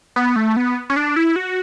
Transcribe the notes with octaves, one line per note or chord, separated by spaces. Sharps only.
B3
A3
B3
C#4
D4
E4
F#4